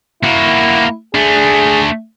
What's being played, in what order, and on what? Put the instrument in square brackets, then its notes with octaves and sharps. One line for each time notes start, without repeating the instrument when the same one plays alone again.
[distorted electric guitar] A#3 F#4 [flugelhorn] E4
[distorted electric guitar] A3 D4 [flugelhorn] G#4